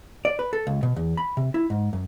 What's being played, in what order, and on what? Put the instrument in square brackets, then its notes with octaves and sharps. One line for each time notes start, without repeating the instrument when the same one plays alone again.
[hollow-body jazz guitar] D5
B4
A4
C#2
B2
E2
B5
C3
E4
G#2
F#2